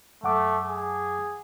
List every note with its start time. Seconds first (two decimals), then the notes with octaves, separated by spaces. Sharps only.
0.23 F#2 A3 F#5 D6
0.65 G#4